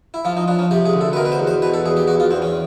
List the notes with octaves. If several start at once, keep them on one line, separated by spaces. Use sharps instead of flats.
E4
F3 F4
D#4
F3 D4
C#4
C3 G4
G#4
D2
A4
B4
B2 A#4
B4
C5
E2
C5
B2 B4
A4
E2 G#4
G4
E2 F#4
F4
E2 C4
C#4